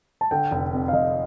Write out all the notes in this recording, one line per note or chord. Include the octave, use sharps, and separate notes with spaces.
A5
D3 G5
F1
F2
F5
F1 D#5